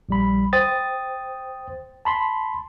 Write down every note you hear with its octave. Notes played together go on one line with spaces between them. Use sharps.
A#1 G3 B5
C5 G5 D#6 A6
A5 B5 C6